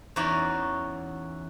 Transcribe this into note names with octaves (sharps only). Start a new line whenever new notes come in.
E2 E3 C#4 D#4 F#4 D5